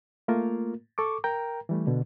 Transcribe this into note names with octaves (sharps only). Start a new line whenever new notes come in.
A3 A#3 F4 A#4
A4 C#6 D6
A#4 G5 A#5
E3 G3 A3
B2 D3